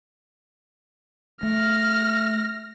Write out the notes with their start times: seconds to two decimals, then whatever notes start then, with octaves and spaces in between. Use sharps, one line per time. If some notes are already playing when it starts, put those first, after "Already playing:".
1.43 A3 F6 A#6